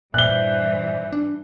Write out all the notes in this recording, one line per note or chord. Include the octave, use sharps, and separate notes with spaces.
G2 A#2 E3 C5 D5 E5 F#6 G7
D4